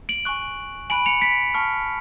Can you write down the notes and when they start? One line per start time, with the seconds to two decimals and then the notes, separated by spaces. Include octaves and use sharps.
0.09 D7 F#7
0.25 G#5 C#6 F#6
0.90 G#5 B5 F#6 D7 F#7
1.06 C#7 F7
1.22 B6 D7
1.54 A5 C#6 F6